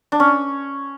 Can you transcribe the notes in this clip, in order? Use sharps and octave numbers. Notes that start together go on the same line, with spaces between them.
D4
C#4